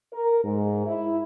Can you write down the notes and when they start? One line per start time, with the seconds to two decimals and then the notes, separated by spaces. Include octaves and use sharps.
0.12 A#4
0.43 G#2
0.86 E4